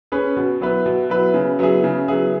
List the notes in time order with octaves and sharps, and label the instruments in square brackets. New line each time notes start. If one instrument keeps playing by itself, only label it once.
[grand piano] C#4 G#4 B4
B2
F#3 B3 E4 B4
B2
F#3 B3 E4 B4
C#3
F#3 B3 E4 G#4
C#3
F#3 B3 E4 G#4